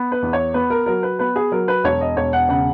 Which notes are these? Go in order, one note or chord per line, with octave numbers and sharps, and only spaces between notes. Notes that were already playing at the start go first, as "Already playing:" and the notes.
Already playing: B3
B4
E2
C#5
B3 B4
A#4
F#3 A#4
B4
B3 B4
G#4
F#3 A#4
B4
E1 C#5
D#5
E1 C#5
F#5
C#3 F#5